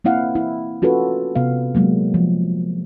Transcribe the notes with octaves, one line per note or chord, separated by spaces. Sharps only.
A#3 C4 E4 F5 F#5
E4
C#4 F4 F#4 A4 B4
C3 B3 F5
F#3 G#3 A#3
F3